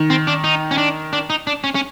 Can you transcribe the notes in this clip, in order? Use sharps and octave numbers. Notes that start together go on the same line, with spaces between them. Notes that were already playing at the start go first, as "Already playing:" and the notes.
Already playing: D#3
C4
D4
D#4
C#4
D4
D4
D#4
D4
C#4
C#4